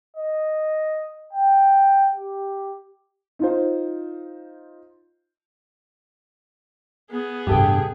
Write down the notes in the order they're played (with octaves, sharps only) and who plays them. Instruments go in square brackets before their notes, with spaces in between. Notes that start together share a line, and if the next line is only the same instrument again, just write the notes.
[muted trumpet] D#5
G5
G4
[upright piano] D#4 F4 C5
[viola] B3 G#4
[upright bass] A1 C3 [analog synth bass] G2 [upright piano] G4 A4 G5